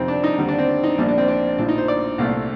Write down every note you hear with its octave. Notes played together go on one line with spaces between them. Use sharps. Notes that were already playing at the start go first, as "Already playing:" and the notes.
Already playing: F2 C3 D#3 C4
D4
D#4
D#2 D3 G3 C4
D4
C4
D#4
A#1 A#2 G3 D4
D4
C4
D4
A#1 A2 F3 D4
D#4
C5
D5
C2 A#2 A3 C4